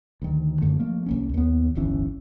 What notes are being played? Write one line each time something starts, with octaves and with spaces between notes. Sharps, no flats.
D2 D#3
F#2 D3 A3
F3 A3 A#3
C2 A#3 C#4
D#2 B3
D1 G1 E3 C#4